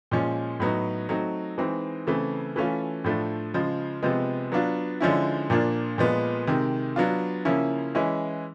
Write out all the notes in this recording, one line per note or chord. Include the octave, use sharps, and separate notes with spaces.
A#2 F3 G#3 C#4
A2 F#3 B3 D#4
F#3 A3 C4 D#4
E3 G#3 C4 D#4
C#3 E3 A3 C4
E3 A3 C#4 F4
A2 F3 A3 D4
C#3 F3 G#3
C3 F3 G#3 B3
F#3 B3 D4 F4
D3 F3 G#3 C#4 E4
A#2 F3 A#3 D4 F4
A#2 F3 G#3 B3
C3 D#3 G#3
F#3 B3 D4 F4
C#3 F3 A#3 C#4 E4
E3 G#3 C#4 E4